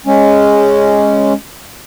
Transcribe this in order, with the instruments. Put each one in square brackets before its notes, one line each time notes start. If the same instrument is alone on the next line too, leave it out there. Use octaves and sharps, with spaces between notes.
[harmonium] G#3 C#4